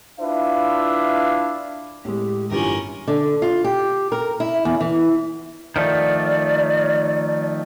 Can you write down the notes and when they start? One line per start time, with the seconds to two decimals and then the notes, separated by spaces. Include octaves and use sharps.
0.20 D4 E4 F4 B4 E5 F5
2.05 A2 G#3 G4
2.51 G1 E3 C#4 F4 G4 A#4
3.08 D3
3.42 F4
3.64 G4
4.12 A#4
4.40 E4
4.65 E2
4.81 E3
5.76 D#3 F3 A3 D5